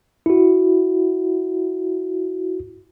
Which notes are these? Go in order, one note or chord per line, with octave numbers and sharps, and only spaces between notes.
E4 F#4